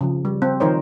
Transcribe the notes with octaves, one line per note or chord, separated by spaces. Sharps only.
C#3 F3
G3
C4
D#3 F3 D#4 A#4 C5 C#5